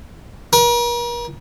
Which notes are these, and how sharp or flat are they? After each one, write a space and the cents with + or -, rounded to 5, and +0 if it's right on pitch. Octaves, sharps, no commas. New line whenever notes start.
A#4 +40